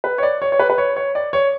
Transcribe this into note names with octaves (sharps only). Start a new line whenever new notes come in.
B4
C#5
D5
C#5
C#5
B4
B4
C#5
C#5
D5
C#5